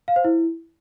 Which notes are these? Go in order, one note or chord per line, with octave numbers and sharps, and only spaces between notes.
F5
C5
E4